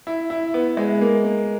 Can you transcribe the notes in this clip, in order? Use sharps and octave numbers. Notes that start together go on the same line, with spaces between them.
E4
E4
B3
G#3
A#3
A#3